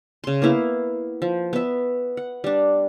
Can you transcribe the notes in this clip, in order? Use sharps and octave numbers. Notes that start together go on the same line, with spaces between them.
C#3 C6
A#3 B3 E4 F5
F3
B3 E5
F#5
G3 D4